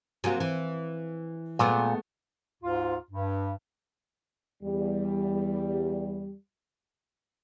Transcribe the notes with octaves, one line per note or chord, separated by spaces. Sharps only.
C3 F#3 A#3 G#5
E3
A#2 G#3 A3 B3
D2 G#2 F4
G2
E2 G3